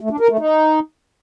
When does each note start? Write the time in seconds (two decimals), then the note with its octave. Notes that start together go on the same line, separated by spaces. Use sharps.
0.01 A3
0.10 D4
0.20 A#4
0.30 A3
0.39 D#4